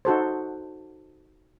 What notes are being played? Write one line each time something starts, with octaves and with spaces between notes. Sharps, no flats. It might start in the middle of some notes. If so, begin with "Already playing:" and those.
D#4 F#4 A4 C5